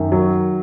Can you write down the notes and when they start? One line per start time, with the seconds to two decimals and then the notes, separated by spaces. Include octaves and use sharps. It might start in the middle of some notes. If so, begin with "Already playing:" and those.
Already playing: F#2 D#3
0.12 F#3